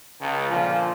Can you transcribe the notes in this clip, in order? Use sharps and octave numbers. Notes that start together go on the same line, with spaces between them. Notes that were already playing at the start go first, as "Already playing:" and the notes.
C#2
A#2 D3 F3